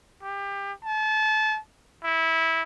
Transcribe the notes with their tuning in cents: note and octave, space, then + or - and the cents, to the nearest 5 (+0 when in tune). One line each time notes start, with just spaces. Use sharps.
G4 +25
A5 -30
E4 -15